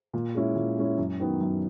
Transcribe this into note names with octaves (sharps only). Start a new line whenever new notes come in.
A#2
G#3 C#4 E4
A#2
G#3 C#4 E4
F#2
D#3 F#3 B3
F#2